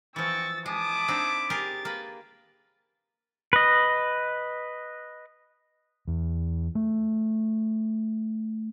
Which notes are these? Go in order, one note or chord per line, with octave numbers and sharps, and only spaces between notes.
E3 F3 C4 G5 C#6 E6 A6
G#3 E4 A5 D6 D#6
C4 D4 D#4
G4 G#4 A#4 A6
A#3 B4
B4 D#5
E2
A3